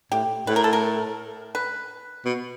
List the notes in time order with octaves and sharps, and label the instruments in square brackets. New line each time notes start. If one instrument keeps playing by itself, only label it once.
[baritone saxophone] A2 [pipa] G4
[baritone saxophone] A2 [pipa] B4
[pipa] A#4
A4
A#4
B4
[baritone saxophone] B2